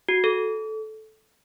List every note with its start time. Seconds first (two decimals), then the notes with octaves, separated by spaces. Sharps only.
0.09 F#4
0.24 A4